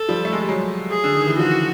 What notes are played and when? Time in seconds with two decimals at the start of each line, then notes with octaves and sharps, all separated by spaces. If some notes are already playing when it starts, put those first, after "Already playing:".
Already playing: A4
0.08 F3 G3
0.25 A3
0.33 G#3
0.41 G3
0.49 F#3 G#3
0.90 G#4
1.04 D3
1.15 D#3
1.27 E3
1.38 D#3 F3 F#4